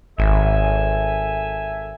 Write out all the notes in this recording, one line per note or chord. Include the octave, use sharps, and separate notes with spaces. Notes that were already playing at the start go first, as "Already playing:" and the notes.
G#1 A4 E5 G#5